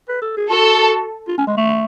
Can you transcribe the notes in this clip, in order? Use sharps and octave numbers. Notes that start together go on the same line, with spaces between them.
B4
A4
G#4
F#4 A4
F4
C#4
G#3
A3